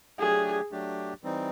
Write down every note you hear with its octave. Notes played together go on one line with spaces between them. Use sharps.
F#3 A3 D4 G4 G#4
F#3 A3 D4 G4
E3 G3 C4 D#4